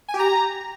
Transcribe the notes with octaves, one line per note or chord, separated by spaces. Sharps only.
G#5
G4
A#5